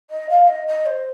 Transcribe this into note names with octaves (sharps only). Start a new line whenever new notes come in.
D#5
F5
D#5
D#5
C5